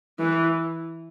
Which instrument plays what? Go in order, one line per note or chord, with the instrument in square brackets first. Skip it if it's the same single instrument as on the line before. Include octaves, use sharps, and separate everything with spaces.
[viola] E3